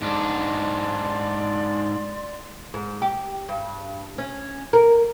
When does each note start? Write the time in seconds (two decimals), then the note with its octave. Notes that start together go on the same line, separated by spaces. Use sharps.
0.01 G#2 D4 D5 C6
2.74 G#2
3.02 G4
3.49 G2
4.18 C#4
4.73 A#4